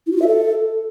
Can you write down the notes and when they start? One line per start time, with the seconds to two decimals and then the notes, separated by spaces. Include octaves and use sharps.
0.07 E4
0.12 F#4
0.17 F4
0.22 E5
0.27 A4